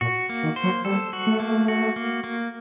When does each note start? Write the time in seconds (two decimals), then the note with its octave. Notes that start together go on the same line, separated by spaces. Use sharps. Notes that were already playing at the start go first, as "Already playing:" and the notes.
0.01 A#2 F#4
0.29 A#3
0.43 D#3
0.56 C5
0.64 F#3
0.85 G3 A4
1.13 F#4
1.27 A3
1.40 A#3
1.68 F#4
1.96 A#3
2.24 A#3